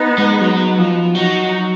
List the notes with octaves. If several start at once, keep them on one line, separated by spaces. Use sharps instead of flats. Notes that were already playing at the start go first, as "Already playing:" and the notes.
Already playing: B3 D#4
G#3
F#3
F3
F#3 D#4 F#4